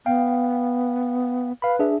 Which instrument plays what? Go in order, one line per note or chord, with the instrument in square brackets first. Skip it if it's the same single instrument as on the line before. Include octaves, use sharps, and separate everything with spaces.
[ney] B3 [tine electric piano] F5 G5
[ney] B4 [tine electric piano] F5 B5
[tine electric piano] D4 G#4 E5